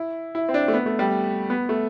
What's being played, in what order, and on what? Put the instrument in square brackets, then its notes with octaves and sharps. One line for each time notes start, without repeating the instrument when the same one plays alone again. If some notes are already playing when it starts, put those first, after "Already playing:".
Already playing: [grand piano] E4
E4
C4
D4
A3
B3
A3
G3
B3
A3